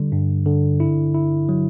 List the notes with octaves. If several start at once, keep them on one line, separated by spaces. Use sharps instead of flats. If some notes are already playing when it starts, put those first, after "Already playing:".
Already playing: D3 G3
G2
D3
E4
E4
F#3